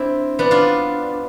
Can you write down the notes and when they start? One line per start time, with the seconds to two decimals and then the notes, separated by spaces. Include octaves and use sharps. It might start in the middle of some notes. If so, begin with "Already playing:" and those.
Already playing: C4 D4 E4
0.39 B3 D4
0.51 D4 F4